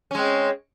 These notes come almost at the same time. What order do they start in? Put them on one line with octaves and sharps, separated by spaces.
C#4 G#3 C4